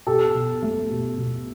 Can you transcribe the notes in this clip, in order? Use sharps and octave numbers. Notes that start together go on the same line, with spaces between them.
B2 G4 A4
B2
A3
B2
B2